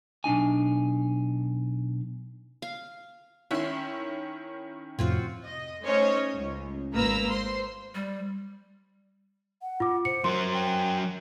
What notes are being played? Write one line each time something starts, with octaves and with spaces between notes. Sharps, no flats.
B1 D4 D#4 G#5
F5
D#3 C#4 E4 E5 C6
F2 A2 C3 C4 F4 F#4
D#5
A3 C#4 D#4 C5 C#5 D#5
C#2
G#1 A#3 B4 A#5 E6
C5 C6
G3
F#5
F4 D6
C5 C#7
F#3 A#4 C6
G5